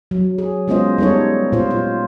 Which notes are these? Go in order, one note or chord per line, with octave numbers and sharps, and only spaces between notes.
F#3
G#4
G#3 B3 C#4 F4 C5 D#5
G3 B3 D#4 A4 C#5
A#2 F4 C5
F4